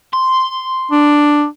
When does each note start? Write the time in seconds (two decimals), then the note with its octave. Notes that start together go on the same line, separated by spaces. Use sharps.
0.13 C6
0.91 D4